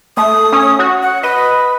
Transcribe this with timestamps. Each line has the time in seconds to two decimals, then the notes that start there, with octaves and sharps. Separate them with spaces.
0.17 A3 D#6
0.52 C#4
0.79 F#4
1.02 F#5
1.23 B4 D#5